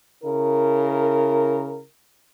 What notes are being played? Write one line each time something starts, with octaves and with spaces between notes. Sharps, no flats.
C#3 E4 A#4